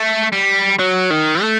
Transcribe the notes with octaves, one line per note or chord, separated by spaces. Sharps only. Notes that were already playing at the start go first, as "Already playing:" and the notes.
Already playing: A3
G3
F#3
D#3
A3